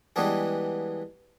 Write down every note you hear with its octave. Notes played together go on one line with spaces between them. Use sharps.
E3 G3 G#3 B3 D4 G#4